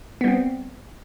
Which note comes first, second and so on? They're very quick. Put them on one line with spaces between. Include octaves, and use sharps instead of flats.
B3 G3 C4